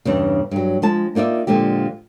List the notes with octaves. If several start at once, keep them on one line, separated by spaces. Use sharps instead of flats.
E2 G2 C#3
G2 F#3
F3 G#3 A5
A#3 D#4 F4 D5 E5
A#2 D3 F3 G#3 G4